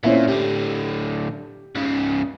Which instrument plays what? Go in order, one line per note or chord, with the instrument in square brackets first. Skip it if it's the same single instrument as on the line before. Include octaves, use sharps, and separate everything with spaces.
[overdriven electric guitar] A#2 [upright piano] C4 C#4 E4
[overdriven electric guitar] A2 D3 [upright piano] G4
[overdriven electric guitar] G#2 C#3